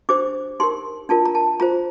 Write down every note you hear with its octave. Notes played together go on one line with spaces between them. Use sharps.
D4 G4 C5 D6
D#4 G4 A#4 C6
D4 F4 A#4 A5
A#5
A5
F4 C5 A#5